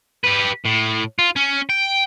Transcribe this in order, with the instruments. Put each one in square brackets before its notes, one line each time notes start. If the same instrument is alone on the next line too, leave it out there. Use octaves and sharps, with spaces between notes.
[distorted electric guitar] G4 B4
A2
F4
C#4
G5